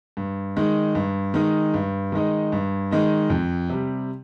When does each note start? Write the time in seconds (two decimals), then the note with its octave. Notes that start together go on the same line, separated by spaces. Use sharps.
0.17 G2
0.57 D#3 G#3 D#4
0.95 G2
1.34 D#3 G#3 D#4
1.74 G2
2.12 D#3 G#3 D#4
2.52 G2
2.91 D#3 G#3 D#4
3.30 F2
3.70 C3 G3